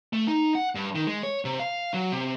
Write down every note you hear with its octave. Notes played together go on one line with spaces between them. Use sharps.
A3
D#4
F#5
G2
D#3
G#3
C#5
C3
F5
F#3
C3